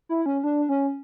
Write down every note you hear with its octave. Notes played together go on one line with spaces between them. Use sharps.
E4
C#4
D4
C#4